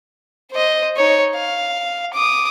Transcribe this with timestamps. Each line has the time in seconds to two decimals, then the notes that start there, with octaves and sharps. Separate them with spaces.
0.52 C5 D#5
0.97 D#4 C#5
1.35 F5
2.13 D6 D#6